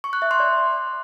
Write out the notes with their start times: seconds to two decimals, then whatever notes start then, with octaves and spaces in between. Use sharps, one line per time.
0.04 C#6
0.13 F#6
0.22 E5
0.31 C6
0.40 D5